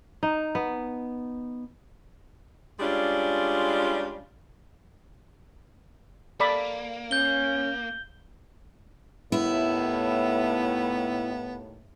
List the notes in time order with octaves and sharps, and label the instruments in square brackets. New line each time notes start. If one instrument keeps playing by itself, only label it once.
[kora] D#4
B3
[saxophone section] G3 G#3 C#4 D4 F4
[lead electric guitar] A#3 [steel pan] A4 D5 B5
[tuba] C#4 [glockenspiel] G6 G7
[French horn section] D#2 A2 [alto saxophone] B3 [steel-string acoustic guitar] E4